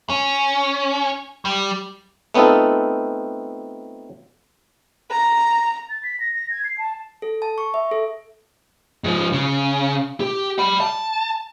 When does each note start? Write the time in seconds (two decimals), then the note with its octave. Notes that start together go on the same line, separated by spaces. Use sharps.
0.09 C#4
1.45 G3
2.34 A3 B3 C4 D#4 F4 A4
5.11 A#5
5.90 A6
6.03 B6
6.20 A#6
6.34 A#6
6.51 G#6
6.65 C7
6.78 A5
7.22 A4
7.42 A5
7.58 C#6
7.74 E5
7.91 A4
9.04 G#2 F3
9.32 C#3
10.20 G4
10.59 D5 B5
10.81 A5